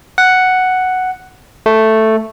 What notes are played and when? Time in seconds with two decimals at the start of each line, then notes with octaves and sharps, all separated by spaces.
0.18 F#5
1.66 A3